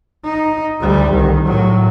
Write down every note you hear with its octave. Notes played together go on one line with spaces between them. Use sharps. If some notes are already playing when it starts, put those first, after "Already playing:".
D#4
D2 G3
C2 D#3
A2 F#3